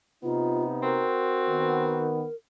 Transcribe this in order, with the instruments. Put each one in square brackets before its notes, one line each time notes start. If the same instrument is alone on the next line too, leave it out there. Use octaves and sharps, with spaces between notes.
[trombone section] C3 B3 D#4 [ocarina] F4
[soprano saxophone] C4 [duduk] F#4 [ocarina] A#4
[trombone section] D#3 B3